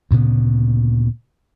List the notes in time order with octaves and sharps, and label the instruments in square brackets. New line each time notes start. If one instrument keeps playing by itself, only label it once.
[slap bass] D2 A#2 C#3 B3